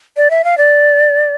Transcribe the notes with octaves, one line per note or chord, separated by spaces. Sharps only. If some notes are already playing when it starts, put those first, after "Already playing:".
D5
E5
F5
D5